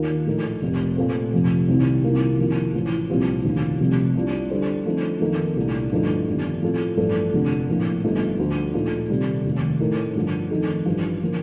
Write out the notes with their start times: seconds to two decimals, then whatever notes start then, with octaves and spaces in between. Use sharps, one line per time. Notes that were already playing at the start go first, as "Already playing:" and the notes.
Already playing: D#2 D#3 A#3 F4 A#4
0.27 A#1 A2 A3 D#4 A#4
0.62 F1 F2 C3
0.97 A#2 A3 C4
1.33 F1 F2 C3 F3
1.68 C2 C3 D#3 G3 C4
2.03 C2 C3 D#3 A#3 F4
2.39 F2 C3 D#3 A#3 F4
2.73 A1 A2 F3
3.10 C2 A#2 F3 C4 G4
3.44 F1 D#2 D3 F3
3.80 F1 F2 C3 G3
4.15 C2 C3 G3 D4 F4
4.50 D3 G3 D4 A4 C5
4.86 D3 F3 A3 C4 D#4
5.20 F2 D#3 A#3 D#4 A4
5.56 C2 A#2 A3 D4
5.91 G2 D3 F3 A3 D#4
6.27 G1 F2 D#3 G3
6.62 A2 F3 C4 F4 A4
6.97 A1 G2 F3 A3 D4
7.33 F1 F2 D3
7.68 A#1 A2 F3 A#3
8.04 G1 G2 F3 A3 D#4
8.39 D2 D3 F3
8.74 A#2 F3 A3 D#4
9.10 C3 D#3 G3
9.44 F1 D#2 D#3
9.80 A2 A3 D#4 A#4
10.15 G2 D3 F3
10.51 F2 D#3 A3 D#4 A4
10.86 A1 G2 F3
11.23 D3 F3 A#3